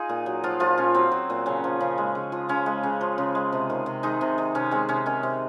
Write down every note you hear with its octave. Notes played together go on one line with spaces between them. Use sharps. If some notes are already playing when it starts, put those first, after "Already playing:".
Already playing: D#4 F4 G#4
A#2
F#3
F3 F#3 F4
A#2 F3 F4
A#2 C#4
F#3 C4
F#3
A#2
C#3 C#4
F3
C#3
G#3
C#3
F3
C#3 C#4
G#3
C#3
F3
C#3
G#3
C3
D#3
C3
D#3 G#3 D#4
C3
D#3
C3 C#4
G#3 C4
C3 C#4
D#3 C#4
C3